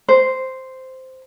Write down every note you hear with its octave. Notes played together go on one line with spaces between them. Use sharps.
C5